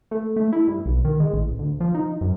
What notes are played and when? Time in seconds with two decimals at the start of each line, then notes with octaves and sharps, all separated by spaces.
0.11 A3
0.36 A3
0.53 E4
0.68 G2
0.86 B1
1.05 D#3
1.20 G#3
1.33 A1
1.59 D2
1.80 F3
1.94 D#4
2.21 F#2